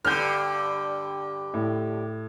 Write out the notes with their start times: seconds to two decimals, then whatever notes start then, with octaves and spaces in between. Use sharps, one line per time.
0.05 G2 D3 F6 G6
1.54 A2